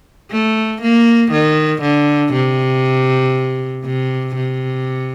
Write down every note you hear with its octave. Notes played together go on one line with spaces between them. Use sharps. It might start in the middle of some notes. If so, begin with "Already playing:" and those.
A3
A#3
D#3
D3
C3
C3
C3